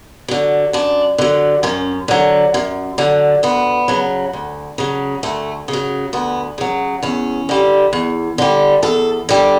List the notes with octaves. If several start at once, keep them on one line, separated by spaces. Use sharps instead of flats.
D3 F#3
F#2 D4
D3 F#3
F#2 C#4
D3 F#3
F#2
D3 F#3
D2 B3
C#3 F#3
D2
C#3 F#3
D2 A3
C#3
F#3
D2 B3
C#3 F#3
E2 C#4
D3 G3
E2
D3 G3
E2 A4
D3 G3